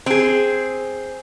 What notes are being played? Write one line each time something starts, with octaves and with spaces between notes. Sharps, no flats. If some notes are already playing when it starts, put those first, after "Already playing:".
C4 G#4